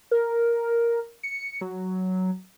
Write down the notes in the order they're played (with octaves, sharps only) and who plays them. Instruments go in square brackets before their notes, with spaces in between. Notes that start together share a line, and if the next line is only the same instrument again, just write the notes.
[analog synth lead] A#4
C#7
F#3